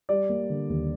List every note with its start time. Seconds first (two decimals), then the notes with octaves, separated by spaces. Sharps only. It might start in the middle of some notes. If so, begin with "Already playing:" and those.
0.09 G3 D5
0.29 A#3
0.50 D3
0.69 D#2